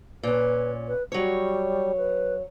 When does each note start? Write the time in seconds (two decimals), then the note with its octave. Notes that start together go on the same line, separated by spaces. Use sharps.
0.23 A#2 C#4 B4
0.88 B4
1.12 F#3 G3 C#5
1.97 B4